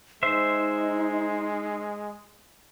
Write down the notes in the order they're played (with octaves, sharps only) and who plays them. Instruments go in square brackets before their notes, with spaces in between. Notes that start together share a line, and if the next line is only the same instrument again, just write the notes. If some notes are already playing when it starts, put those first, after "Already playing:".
[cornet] G#3 [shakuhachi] D#4 [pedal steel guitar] C5 E5